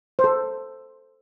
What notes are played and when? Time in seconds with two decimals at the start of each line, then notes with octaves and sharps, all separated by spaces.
0.19 C5
0.24 A4